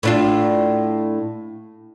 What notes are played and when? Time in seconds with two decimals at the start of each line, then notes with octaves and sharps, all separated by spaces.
0.03 A2 D4 F4